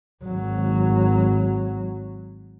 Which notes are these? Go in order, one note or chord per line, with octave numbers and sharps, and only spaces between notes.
G#1 F#3